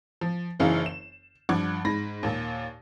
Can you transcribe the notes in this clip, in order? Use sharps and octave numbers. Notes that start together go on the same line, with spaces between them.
F3
F#1 F#2 E3 D#4 G#4 F5
E7
G2 F3 F#5 D6 G#6
G#2 B5 A#6
D#2 A#2